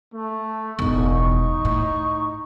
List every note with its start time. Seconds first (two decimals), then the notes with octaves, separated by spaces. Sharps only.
0.14 A3
0.79 E1 A1 D#4 C#6
1.65 A2